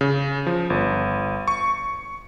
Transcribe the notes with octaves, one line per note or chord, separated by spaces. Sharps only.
C#3
F3
G1
C#6